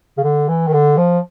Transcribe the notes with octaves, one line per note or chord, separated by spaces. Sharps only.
C#3
D3
E3
D#3
D3
F3